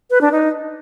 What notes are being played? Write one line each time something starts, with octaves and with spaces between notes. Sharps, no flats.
B4
D4
D#4